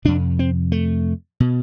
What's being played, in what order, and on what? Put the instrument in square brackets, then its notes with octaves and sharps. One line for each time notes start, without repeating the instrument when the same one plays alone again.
[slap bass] F2 C3 D4
C4
A3
B2